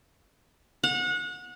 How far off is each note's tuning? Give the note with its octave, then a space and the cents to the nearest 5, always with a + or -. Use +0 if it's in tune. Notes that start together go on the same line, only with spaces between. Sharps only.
F#5 -30